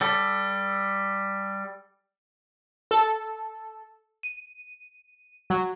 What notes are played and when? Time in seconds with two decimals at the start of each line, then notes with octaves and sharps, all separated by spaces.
0.01 G3 A4
2.91 A4
4.23 D#7
5.50 F#3